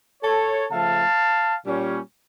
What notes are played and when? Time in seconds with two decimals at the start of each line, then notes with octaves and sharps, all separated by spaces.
0.23 A4 C#5
0.70 C#3 F3 A3 F5 A5
1.66 A#2 G3 C#4